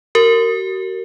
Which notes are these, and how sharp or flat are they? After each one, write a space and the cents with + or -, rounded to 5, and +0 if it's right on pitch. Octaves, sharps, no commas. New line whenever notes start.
F#4 +40 A#4 -20